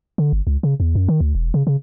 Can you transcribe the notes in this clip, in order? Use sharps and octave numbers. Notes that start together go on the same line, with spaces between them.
D3
G1
C#2
C#3
E2
F#2
D#3
D2
E1
C#3
C#3